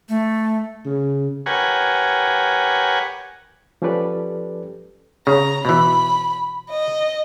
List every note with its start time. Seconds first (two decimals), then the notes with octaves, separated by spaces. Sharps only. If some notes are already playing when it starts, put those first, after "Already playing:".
0.09 A3
0.85 C#3
1.46 G4 A#4 B4 C#5 F#5 G#5
3.82 F3 C#4 G4 A4 B4 D5
5.27 C#3 A#5
5.65 B2 E3 B5
6.70 D#5